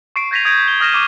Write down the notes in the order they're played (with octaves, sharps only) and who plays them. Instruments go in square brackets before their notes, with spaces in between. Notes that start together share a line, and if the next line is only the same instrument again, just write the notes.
[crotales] C#6 C7 D7
G6 G#6 A#6 B6 D#7 F7
D#6 G6 G#6 A#6 D7
G7
D#6 F6 A#6 D#7 E7 G7
C#6 D6 D#7